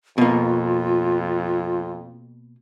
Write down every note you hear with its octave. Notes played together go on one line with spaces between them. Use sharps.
F2 B2 A#3 F4